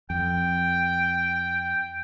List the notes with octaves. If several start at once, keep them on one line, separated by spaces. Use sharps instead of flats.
F2 G5